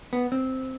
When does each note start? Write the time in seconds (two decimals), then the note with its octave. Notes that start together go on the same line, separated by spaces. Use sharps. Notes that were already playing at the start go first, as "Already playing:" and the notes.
0.13 B3
0.32 C4